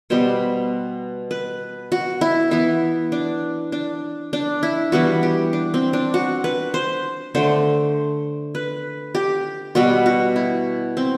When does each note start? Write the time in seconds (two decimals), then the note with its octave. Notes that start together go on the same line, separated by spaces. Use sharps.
0.10 B2 G3 B3 C5
1.31 B4
1.92 F#4
2.21 E4
2.51 E3 B3 E4
3.12 D4
3.72 D4
4.33 D4
4.63 E4
4.92 E3 G3 B3 F#4
5.23 G4
5.53 D4
5.74 C4
5.93 D4
6.14 F#4
6.44 B4
6.74 C5
7.35 D3 A3 C5
8.55 B4
9.15 G4
9.75 B2 G3 B3 F#4
10.06 F#4
10.36 E4
10.97 C4